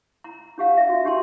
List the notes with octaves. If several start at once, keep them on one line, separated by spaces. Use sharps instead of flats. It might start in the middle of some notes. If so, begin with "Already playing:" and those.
A#5
D4 G4 F5 F#5
E5
F#4
D4 G4 G5 A5 C6